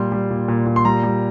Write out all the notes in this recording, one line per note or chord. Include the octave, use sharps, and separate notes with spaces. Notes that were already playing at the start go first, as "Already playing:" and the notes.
Already playing: A#2 G3 C6
G3
A#2
A#2
A#2
C6
G3 A#5
G3